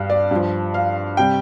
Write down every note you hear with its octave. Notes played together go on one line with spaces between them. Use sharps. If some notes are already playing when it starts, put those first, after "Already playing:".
Already playing: G2 G3 F5
D5
G2 F3
F5
C3 G3 G5